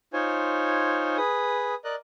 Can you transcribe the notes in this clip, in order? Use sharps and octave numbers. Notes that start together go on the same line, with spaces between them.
D#4 F4 C5 C#5 G#5
G#4 B4 D#6
A#4 D5 D#5 F#6